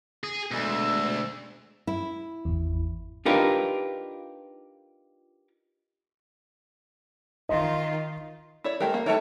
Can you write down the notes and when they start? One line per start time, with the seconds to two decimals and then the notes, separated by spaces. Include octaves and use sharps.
0.24 G#4
0.51 D2 B2 G#3 E6
1.87 E4
2.45 G#1 E2
3.26 D4 D#4 F4 G4 A#4 B4
7.49 D#3 F4 D#5 C6
8.64 E4 C#5 D5
8.80 G3 A3 G4 A#4
8.94 A#3
9.06 A3 D#4 A4 B4 C#5 G5